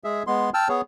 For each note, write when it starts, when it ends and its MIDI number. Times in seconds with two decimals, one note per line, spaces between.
0.04 0.23 56
0.04 0.23 68
0.04 0.23 76
0.27 0.50 56
0.27 0.50 59
0.27 0.50 84
0.54 0.68 79
0.54 0.68 81
0.54 0.68 88
0.54 0.68 89
0.69 0.81 59
0.69 0.81 68
0.69 0.81 73